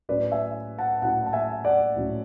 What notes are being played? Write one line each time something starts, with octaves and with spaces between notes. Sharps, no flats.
A2 F#3 C#4 E4 B4 D5
E5 G#5
F#5 A5
A2 F#3 C#4 E4 F#5 A5
A5
E5 G#5
D5 F#5
A2 F#3 C#4 E4